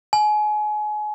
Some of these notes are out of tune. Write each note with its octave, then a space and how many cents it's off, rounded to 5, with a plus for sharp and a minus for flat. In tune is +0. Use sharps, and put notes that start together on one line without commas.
G#5 +30